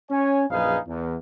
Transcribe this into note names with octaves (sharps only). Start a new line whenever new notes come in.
C#4 C#5 G#5
A#1 F#2 D#4 G#4 B4 F5
E2